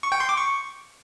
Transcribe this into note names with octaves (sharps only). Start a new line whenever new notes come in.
C#6
G5
C6
D6
C#6